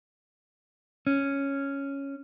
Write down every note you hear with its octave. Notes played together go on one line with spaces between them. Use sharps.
C#4